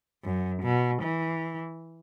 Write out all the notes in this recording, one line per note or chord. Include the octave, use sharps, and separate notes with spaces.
F#2
B2
E3